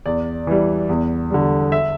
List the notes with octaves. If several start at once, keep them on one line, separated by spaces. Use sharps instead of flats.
E2 D5
E3 G3
E2
D3 G3
E5